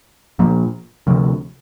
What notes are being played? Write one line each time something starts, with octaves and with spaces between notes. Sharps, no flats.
A#2 F3 A#3
D2 C3 F3